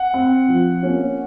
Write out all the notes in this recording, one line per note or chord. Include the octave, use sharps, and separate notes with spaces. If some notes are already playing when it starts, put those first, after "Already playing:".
Already playing: F#5
C4
F3
A#3 C#4